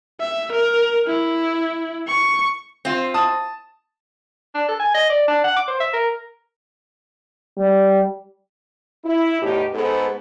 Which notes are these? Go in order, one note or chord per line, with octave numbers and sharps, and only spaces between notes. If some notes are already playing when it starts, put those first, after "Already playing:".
E5
A#4
E4
C#6
C4 F4
A5 D#6
D4
A4
G#5
D#5
D5
D4
F#5
D6
C5
E5
A#4
G3
E4
E2 A2 D#4 G4
G#2 B3 G#4 A4